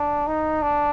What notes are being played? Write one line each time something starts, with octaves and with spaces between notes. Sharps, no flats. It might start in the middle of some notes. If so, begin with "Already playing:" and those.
Already playing: D4
D#4
D4